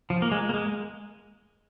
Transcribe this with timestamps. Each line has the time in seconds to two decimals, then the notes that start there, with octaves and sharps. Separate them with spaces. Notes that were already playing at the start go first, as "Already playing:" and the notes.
0.10 F3
0.22 A#3
0.32 G#3
0.49 A#3
0.54 G#3